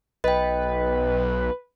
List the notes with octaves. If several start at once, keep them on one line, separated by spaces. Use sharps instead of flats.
B1 B4 D#5 G5